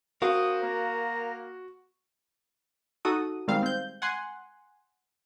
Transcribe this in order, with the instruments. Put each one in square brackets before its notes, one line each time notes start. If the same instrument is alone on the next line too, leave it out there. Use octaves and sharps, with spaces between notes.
[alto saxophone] C4 [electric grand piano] F#4 [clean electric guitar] A#4 F5 [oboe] D#6
[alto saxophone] A#3 [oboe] A#5
[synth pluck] D#4 F#4 A4 D#6
D#3 G3 G#3 C4 F5
C4 G6
F#5 G#5 C6